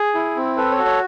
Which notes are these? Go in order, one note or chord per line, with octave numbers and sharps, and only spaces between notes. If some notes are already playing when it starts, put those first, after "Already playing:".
Already playing: G#4
E4
C4
A4 B4
C#5
F#4
C#5